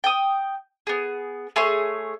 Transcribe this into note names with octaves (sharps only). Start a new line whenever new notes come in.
G5 D#6
B3 G#4
A3 G#4 C#5 C6